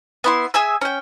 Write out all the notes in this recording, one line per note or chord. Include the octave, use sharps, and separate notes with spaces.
B3 E4 C6
G#4 E5 G#5 E6
C#4 G5